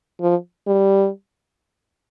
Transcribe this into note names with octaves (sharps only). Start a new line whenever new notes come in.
F3
G3